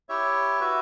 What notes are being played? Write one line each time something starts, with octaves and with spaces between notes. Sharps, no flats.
E4 G4 C#5 E5 G5
F#4 B4 E5